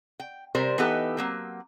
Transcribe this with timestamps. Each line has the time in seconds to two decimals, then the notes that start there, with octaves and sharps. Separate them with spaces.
0.20 G5
0.55 C3 G3 A#4 C5
0.78 E3 B3 D#4 G4 A4
1.17 F#3 A#3 C4